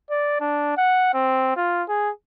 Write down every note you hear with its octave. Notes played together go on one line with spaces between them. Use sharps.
D5
D4
F#5
C4
F4
G#4